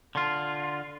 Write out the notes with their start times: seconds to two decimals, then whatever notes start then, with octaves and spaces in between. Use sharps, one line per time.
0.15 D3 F4